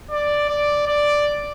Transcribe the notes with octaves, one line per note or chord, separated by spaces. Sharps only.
D5
D5
D5